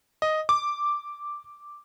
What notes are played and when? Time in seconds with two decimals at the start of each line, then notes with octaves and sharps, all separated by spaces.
0.22 D#5
0.49 D6